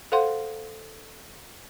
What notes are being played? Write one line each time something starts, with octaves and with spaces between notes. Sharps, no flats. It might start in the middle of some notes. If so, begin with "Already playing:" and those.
A4 C5 F5 F#5 C6